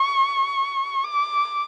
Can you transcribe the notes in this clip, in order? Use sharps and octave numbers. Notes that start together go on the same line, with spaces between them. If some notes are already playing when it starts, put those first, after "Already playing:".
Already playing: C#6
D6